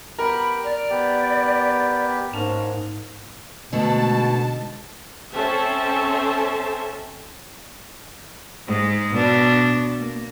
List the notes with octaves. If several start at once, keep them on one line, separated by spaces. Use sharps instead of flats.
B3 G4 A#4 B5
D5 F6
B3 G4
G#2 A#3 C#4 A5 F7
G#2 B2 D3 A3 B3 A5
C4 C#4 A4 C5 E5 A5
G#2 G#3
B2 D4
A#3